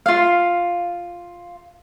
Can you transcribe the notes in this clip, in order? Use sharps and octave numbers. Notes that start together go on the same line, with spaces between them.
F4 F5